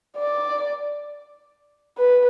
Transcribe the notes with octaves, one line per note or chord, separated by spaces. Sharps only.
D5
B4